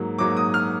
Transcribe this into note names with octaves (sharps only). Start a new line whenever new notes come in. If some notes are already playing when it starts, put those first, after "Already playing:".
Already playing: G#2 F#3 A#3
G#2 F#3 A#3 D6
D#6
F6